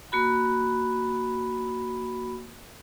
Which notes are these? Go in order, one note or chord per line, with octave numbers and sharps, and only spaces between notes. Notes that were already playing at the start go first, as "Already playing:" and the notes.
A#3 F#4 B5